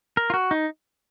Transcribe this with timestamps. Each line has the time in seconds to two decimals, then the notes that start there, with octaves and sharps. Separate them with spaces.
0.17 A#4
0.30 F4
0.34 F#4
0.51 D#4